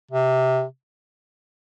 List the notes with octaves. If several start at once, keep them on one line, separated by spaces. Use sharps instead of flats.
C3